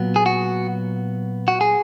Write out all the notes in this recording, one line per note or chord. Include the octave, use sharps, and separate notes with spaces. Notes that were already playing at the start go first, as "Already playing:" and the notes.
Already playing: A#2 F#3 B3
G#4
F#4
F#4
G#4